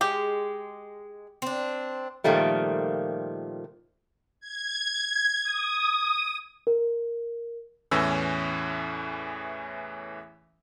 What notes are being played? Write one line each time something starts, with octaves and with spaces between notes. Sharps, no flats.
G#3 G4
C4 D4
A#2 D#3 F3 G3 A3
G#6
D#6
A#4
E2 A2 E3 C#4 E6